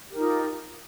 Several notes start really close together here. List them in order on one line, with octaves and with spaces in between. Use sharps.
G4 A#4 D#4 F4